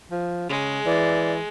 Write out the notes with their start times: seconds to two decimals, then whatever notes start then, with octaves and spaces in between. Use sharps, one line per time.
0.11 F3
0.49 C#3 G#3
0.86 E3 D5